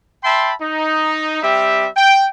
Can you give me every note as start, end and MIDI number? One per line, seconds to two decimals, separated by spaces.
0.24 0.53 76
0.24 0.53 79
0.24 0.53 81
0.24 0.53 83
0.24 0.53 84
0.61 1.39 63
1.42 1.88 55
1.42 1.88 60
1.42 1.88 67
1.42 1.88 76
1.97 2.27 79